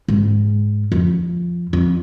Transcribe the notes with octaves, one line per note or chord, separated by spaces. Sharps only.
G#2
F2
F2